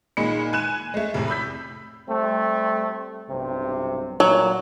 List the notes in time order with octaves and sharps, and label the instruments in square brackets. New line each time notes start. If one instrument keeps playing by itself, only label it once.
[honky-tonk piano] A#2 D#3 G#3 B5 C#7
G#5 F#6 E7
G#3 A3
F1 A2
B5 E6 G6 B6
[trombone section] G3 A3 C4
B1 G2 C3
[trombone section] A#2 [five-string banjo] F#3